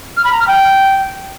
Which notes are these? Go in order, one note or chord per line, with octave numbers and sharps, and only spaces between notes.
F6
B5
A#5
F6
G5